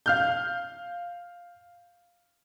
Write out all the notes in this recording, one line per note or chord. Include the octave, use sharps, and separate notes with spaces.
F5 F6 G6